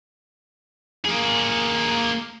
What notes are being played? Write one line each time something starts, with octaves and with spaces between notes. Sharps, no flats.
A#3 G#4